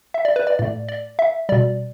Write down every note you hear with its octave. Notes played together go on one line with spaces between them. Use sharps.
E5
D5
B4
D5
A2 A3 D5
D5
E5
B2 G3 D5